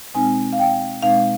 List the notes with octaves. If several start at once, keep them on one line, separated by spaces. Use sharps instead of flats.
B2 G#3 C4 D#4 G#5
F5
G5
B2 G#3 C4 D#4 F5